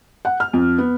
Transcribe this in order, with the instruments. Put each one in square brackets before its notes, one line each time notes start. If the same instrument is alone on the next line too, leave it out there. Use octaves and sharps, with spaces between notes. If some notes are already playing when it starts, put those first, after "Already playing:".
[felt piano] F#5
F6
F2
B3